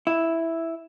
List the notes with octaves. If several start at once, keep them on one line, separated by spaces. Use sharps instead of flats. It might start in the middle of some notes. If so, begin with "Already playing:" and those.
E4